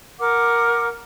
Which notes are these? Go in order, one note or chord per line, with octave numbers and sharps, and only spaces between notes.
A#4 F#5 D6